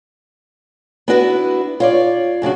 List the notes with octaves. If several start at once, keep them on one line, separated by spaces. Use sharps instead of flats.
B3 D4 E4 F#4 A4 B4
F4 C#5 D5
F#2 C#3 D4 F#4